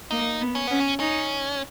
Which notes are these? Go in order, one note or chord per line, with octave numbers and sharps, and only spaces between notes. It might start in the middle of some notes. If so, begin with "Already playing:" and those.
A#3 D#4
B3
C#4
B3 C#4
C#4
C#4 D#4